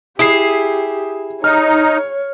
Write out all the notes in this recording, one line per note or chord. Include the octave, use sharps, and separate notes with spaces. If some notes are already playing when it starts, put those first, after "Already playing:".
E4 G4 G#4 D#6 C7
D#4 C#5 F6